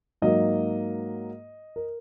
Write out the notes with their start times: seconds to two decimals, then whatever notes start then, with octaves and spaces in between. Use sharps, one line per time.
0.22 G#2 F#3 A#3 D#5
1.76 A#4